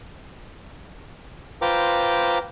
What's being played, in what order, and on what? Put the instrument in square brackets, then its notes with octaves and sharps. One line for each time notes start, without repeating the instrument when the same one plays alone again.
[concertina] F4 B4 C5 G5 A#5 D6